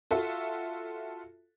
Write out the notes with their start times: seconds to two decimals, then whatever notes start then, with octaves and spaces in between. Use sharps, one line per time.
0.11 F4 F#4 A4 E5